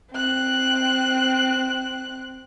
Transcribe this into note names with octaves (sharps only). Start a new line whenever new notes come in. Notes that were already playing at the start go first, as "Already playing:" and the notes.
C4 F#6